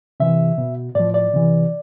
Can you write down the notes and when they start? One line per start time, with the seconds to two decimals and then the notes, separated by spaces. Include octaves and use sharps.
0.20 C3 E3 E5
0.58 B2
0.95 A2 F3 D5
1.14 D5
1.34 C3 E3